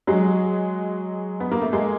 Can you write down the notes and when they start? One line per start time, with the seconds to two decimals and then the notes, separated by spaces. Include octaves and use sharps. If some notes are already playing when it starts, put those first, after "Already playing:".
0.07 F#3 G#3
1.40 B3
1.52 A#3
1.61 A3
1.73 G#3 A#3